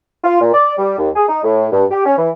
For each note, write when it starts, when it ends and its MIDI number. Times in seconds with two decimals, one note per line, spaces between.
0.24 0.39 65
0.41 0.51 46
0.54 0.73 74
0.78 0.98 55
0.99 1.10 39
1.16 1.27 68
1.29 1.41 63
1.44 1.67 45
1.72 1.84 43
1.91 2.04 67
2.06 2.17 61
2.18 2.30 52